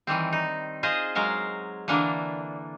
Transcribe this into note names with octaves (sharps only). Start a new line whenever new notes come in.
D#3 E3 G3 C4
D#4
F4 G#4 C5 D#5
F#3 G#3 A#4 F5
D3 E3 A#3 D4